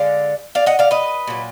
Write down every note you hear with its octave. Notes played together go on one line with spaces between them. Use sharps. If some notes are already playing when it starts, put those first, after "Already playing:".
Already playing: D3 G#3 D5 F5
D5 F5
D#5 F#5
D5 F5
B4 D#5
A#2 F#3